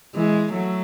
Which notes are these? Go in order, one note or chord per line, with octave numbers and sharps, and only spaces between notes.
E3 G#3
F#3 A3